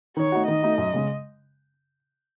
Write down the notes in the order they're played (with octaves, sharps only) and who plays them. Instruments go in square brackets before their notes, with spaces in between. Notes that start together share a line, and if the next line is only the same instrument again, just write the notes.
[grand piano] D#3 [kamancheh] C#5
[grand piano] A3 D#4 F#4
[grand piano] D#3 [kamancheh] D#5
[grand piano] A3 D#4 F#4
F#2
C#3 G#3